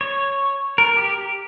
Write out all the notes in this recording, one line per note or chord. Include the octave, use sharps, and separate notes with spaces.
C#5
A#4
G4